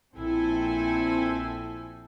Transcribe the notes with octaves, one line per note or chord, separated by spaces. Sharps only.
A#1 C4 E4 A4 G#5